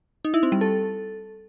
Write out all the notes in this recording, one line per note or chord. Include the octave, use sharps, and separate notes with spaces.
D#4
E4
C4
G3
A4